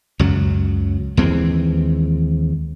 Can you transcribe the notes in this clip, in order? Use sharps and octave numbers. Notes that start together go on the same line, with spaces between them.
C#2 F#2 F#3
D#2 E3 G#3 C4